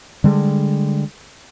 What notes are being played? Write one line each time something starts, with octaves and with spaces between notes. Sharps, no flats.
D3 G3 G#3